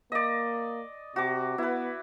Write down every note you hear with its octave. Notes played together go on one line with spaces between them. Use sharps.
A#3 D5 D#5
C3 F#4 D6
B3 E4 B4